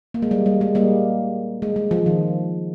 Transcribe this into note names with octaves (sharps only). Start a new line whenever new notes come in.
A#3
G#3
G3
G3
G#3
G3 A#3
G#3
G#3
F3
D#3